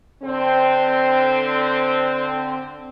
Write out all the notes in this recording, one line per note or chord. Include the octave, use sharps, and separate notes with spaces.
D3 C4